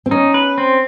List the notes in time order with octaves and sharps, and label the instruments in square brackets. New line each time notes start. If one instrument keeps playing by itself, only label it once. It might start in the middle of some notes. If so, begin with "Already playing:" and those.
[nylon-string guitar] C4
[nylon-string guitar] C#4 [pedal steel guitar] D#4
[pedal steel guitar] B4
C4